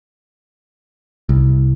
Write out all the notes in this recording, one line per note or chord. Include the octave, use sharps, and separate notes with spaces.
C2